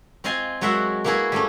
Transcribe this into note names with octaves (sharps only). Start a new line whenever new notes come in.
C4 F4 D#5 F5 G#5
F#3 G#3 F#4 A#4 E5 F#5
A#3 B3 E4 F#4 G#4 B4
G3 A3 C#4